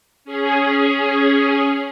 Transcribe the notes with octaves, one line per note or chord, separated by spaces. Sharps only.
C#4 G#4